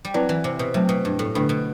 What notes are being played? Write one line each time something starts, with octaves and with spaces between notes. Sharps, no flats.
G3
F#3 C4 E4 B4 D5
E3
C3
B2
C3 F#3 A3 C4
B2
G2
A2
B2 D3 A3 D4
B2